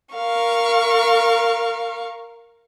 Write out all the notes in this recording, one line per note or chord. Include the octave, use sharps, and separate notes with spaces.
A#4 F5 C#6